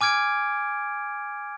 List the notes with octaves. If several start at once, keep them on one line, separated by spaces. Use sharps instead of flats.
G#5 D6 F6 G#6 D7